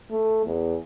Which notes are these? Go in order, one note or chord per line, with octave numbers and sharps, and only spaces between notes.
A3
E2